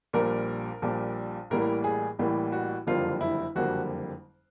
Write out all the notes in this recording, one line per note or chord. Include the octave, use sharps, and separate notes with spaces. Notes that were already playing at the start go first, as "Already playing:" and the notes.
A#1 A#2 G3 A#4
A#1 A#2 G3
A1 A2 E3 G3 A#3 A#4
G#4
A1 A2 E3 G3 A#3
F#4
F#1 F2 D3 G3 A#3 F4
E4
F#1 F2 D3 G3 A#3 F#4